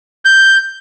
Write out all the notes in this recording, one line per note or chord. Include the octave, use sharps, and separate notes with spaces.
G6